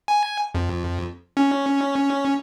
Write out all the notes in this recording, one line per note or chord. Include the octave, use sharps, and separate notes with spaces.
G#5
F2
C#4